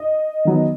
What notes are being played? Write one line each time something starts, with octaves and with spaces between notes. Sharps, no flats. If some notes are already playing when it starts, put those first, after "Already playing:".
Already playing: D#5
D#3 F#3 B3